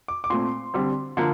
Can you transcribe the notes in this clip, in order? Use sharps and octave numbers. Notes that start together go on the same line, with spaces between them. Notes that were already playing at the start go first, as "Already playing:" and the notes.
D6
D6
A#2 A3 C4 C6
D3 G3 C4
D3 F3 A#3